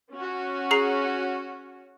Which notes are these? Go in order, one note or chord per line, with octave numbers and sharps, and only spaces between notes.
C#4 F#4
G#4 A#5 C7